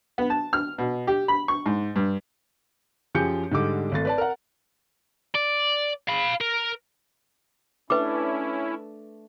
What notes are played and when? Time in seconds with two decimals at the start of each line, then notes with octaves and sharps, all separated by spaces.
0.18 B3
0.30 A5
0.53 F6
0.78 B2
1.07 G4
1.28 B5
1.48 C#6
1.66 G#2
1.96 G2
3.15 F#2 F3 G4 G#4 G6 C#7
3.52 G#2 D3 G3 D6
3.92 G#1 A3 A6
4.05 B4 D5 A5
4.18 A#4 F#5
5.35 D5
6.08 F5 B5
6.41 A#4
7.90 A3 C#4 D4 E4 B4 D6